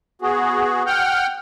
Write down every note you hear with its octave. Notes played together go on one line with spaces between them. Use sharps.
B3 F#4 G#4
F#5 G5 F6 G6